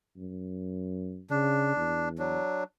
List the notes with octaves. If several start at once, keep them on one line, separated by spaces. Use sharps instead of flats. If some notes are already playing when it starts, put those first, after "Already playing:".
F#2
C#3 D4
E2
F#3 D4